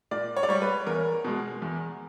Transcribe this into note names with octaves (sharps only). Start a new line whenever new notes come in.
A#2 D5
C#5
D5
G3 C#5
B4
E2 A#4
B2 G#3
E2